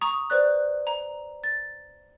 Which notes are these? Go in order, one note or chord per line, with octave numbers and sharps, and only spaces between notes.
A#5 C#6 D#6
B4 C5 D5 F#6
A#5
A6